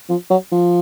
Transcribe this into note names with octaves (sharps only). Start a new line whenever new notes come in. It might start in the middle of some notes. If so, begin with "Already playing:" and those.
F3
F#3
F3